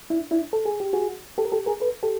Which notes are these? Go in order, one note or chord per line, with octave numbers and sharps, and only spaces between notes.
D4 E4
D4 E4
A4
G#4
G4
F#4 G#4
G4 A4
A#4
G4 A4
G#4 A#4
A4 B4
G4 A4